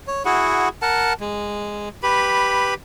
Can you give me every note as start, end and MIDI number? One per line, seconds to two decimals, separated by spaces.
0.07 0.23 73
0.25 0.68 64
0.25 0.68 66
0.25 0.68 68
0.25 0.68 78
0.82 1.13 70
0.82 1.13 78
0.82 1.13 81
1.20 1.89 56
2.03 2.74 67
2.03 2.74 71
2.03 2.74 83